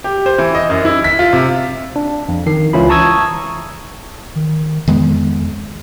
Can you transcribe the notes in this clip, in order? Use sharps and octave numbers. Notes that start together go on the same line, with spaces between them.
G4
C5
E3
D#5
F#2
E4
B6
F4
C3
D4
F2
D#3 C7
C#2 E3 C#4 E4 F4 B5
A5 A#5 C#6 D#6 E6 G#6
D#3
F2 D#3 G#3 B3